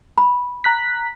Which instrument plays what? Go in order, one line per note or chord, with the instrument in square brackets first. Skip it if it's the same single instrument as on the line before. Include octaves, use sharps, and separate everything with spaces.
[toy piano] B5
[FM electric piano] A#5 F#6 B6